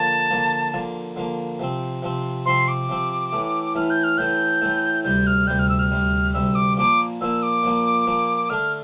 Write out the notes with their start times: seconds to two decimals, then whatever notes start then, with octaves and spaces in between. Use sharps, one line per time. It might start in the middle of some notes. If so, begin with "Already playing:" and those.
Already playing: D3 F3 A#3 A5
0.30 D3 F3 A#3
0.74 D3 F3 A#3
1.16 D3 F3 A#3
1.59 C3 F3 C4
2.02 C3 F3 C4
2.46 C3 F3 C4 C6
2.68 D6
2.89 C3 F3 C4
3.32 A2 E3 A3
3.75 A2 E3 A3 F6
3.90 G6
4.04 F6
4.18 A2 E3 A3 G6
4.62 A2 E3 A3
5.04 D2 C3 G3 G6
5.27 F6
5.47 D2 C3 G3 G6
5.59 F6
5.69 E6
5.79 F6
5.91 D2 C3 G3
6.34 D2 C3 G3 E6
6.55 D6
6.77 A#2 F3 A#3 D6
7.21 A#2 F3 A#3 E6
7.43 D6
7.63 A#2 F3 A#3
8.07 A#2 F3 A#3
8.50 D3 A3 D4 F6